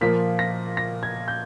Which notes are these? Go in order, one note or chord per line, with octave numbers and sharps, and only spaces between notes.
A#2 F3 A#3 B6
A#6
A#6
G#6
G6